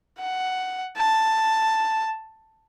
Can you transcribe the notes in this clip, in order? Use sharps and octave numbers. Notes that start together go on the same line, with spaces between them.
F#5
A5